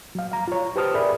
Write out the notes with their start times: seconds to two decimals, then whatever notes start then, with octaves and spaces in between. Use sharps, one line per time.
0.15 F#3 F5
0.32 F5 A#5
0.48 F4 C#5
0.76 G4 B4 C5 A5 D#6 F6
0.94 G#4 A#4 D5 E5 B5